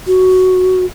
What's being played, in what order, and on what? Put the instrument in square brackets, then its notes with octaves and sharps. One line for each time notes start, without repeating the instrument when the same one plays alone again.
[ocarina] F#4